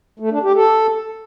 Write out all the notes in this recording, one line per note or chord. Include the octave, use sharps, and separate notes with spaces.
A3
D4
G4
A4